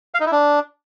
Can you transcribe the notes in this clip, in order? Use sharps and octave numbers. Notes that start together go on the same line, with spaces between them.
F5
D#4
E4
D4